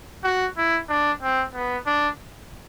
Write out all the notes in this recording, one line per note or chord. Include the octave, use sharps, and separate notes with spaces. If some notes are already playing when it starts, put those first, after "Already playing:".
F#4
E4
D4
C4
B3
D4